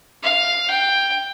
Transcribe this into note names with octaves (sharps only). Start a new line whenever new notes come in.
F5
G5